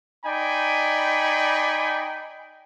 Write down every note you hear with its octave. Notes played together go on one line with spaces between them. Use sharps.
D#4 D5 G5 G#5 B5